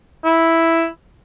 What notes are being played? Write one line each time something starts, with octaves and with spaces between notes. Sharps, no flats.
E4